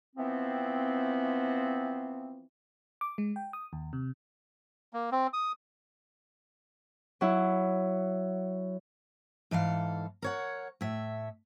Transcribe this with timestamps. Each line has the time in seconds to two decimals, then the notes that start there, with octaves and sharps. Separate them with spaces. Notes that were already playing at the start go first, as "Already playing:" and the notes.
0.16 E3 F3 B3 C4
3.01 D6
3.18 G#3
3.36 G5
3.53 D#6
3.73 D#2
3.93 C3
4.93 A#3
5.12 C4
5.33 D#6
7.21 F#3 E4
9.51 G#2 E3 A4 F5
10.22 A#4 C#5 F#5
10.81 A2 E5